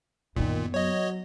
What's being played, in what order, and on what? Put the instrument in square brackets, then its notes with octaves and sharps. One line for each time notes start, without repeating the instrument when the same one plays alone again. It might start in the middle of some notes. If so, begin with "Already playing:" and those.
[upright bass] F#2 B3 [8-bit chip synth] A#2 [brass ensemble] D#3
[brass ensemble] F#3 [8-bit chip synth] C#5 D#5